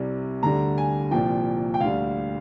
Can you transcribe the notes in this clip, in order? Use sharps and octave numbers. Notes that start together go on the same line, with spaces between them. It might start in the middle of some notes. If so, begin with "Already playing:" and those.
Already playing: C2 C3 G3
D2 D3 G3 A#5
G#5
C2 A#2 F3 G5
G5
D2 D3 G3 F5